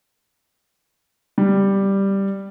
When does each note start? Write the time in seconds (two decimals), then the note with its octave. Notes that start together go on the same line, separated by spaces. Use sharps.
1.38 G3